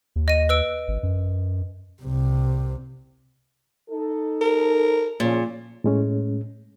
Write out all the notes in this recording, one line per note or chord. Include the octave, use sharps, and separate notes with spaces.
D#2
D#5 D#7
B4 E6 D7
G#1
F#2
C2 C3
D#4 A4
A#4
A#2 C#3 F3
A2 G#3 C#4